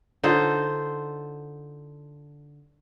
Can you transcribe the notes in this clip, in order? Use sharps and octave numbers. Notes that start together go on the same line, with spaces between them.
D3 D#4 F4 C5